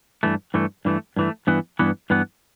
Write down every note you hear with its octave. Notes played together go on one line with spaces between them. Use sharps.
G2 E3 A3
G2 E3 A3
G2 E3 A3
G2 E3 A3
G2 E3 B3
G2 E3 B3
G2 E3 B3